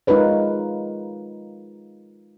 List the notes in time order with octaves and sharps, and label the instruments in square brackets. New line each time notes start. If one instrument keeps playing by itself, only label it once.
[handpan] G#3 D#4 F4 A#4 B4 C#5